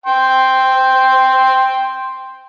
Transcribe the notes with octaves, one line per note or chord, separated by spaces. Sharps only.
G5 C6